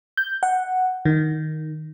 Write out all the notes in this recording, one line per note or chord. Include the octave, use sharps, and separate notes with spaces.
G6
F#5
D#3